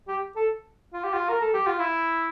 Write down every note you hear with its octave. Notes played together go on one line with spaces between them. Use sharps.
G4
A4
F4
G4
F4
A#4
A4
G4
F4
E4